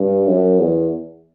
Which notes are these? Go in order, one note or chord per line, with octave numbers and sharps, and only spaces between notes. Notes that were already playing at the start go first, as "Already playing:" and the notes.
Already playing: G2
F#2
E2